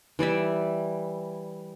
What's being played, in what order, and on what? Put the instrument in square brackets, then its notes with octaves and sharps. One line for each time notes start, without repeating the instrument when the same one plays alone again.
[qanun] E3 G3 D5 E5